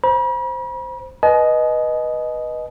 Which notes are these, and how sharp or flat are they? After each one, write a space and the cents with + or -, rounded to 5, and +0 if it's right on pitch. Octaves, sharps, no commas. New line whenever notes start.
C5 +0 B5 -45
B4 -15 D#5 +0 G#5 +45